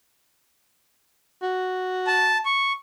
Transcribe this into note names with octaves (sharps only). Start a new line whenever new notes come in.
F#4
A5
C#6